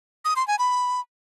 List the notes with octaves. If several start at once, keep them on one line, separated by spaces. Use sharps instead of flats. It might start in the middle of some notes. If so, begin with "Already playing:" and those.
D#6
C6
G#5
B5